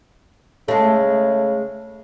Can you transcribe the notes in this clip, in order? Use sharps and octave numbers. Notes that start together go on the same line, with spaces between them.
C#3 G#3 A3